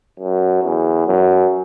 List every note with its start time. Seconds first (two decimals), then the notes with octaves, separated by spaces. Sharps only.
0.20 F#2
0.63 E2
1.07 F#2